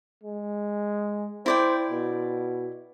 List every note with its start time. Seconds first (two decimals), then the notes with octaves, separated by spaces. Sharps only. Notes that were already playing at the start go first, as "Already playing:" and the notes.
0.23 G#3
1.46 E4 C5 D5 G5
1.90 B2